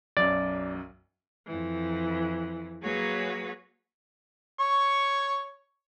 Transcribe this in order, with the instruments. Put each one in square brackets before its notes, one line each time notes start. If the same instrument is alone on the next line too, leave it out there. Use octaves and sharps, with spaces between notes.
[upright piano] B1 F#2 [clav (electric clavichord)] D5
[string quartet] F2 E3
F#3 A#3 F#4 G#4 B4 C#5
[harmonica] C#5 C#6